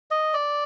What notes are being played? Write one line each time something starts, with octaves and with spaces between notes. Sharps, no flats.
D#5
D5